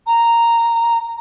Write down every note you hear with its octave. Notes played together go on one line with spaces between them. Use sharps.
A#5